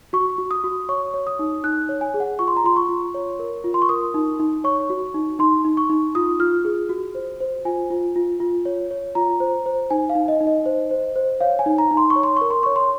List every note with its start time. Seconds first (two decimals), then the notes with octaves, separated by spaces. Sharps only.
0.13 F#4 C#6
0.38 F#4
0.51 D#6
0.64 F#4
0.89 C#5 C#6
1.14 C#5
1.27 D#6
1.39 D#4
1.64 D#4 F#6
1.89 C#5
2.01 G#5
2.14 G#4
2.20 F#5
2.39 F4 C#6
2.48 C6
2.57 A#5
2.64 F4 C6
2.76 C#6
2.89 F4
3.14 C#5
3.39 A#4
3.64 F4
3.74 C6
3.82 C#6
3.89 A#4 D#6
4.14 D#4
4.40 D#4
4.64 C#5 C#6
4.90 F#4
5.14 D#4
5.39 D#4 C6
5.65 D#4
5.77 C#6
5.90 D#4
6.15 F4 D#6
6.39 F4 F6
6.65 G#4
6.89 F#4
7.15 C5
7.40 C5
7.65 F4 G#5
7.90 F4
8.16 F4
8.40 F4
8.65 C#5
8.91 C#5
9.15 F4 A#5
9.40 C5
9.66 C5
9.90 D#4 G#5
10.09 F5
10.15 D#4
10.28 D#5
10.41 D#4
10.47 D#5
10.66 C5
10.91 C5
11.16 C5
11.41 C#5 F5
11.59 G#5
11.66 D#4
11.78 A#5
11.91 D#4
11.97 C6
12.10 C#6
12.16 C#5
12.23 C6
12.37 A#4 C#6
12.50 C6
12.63 C#5 C#6
12.76 C6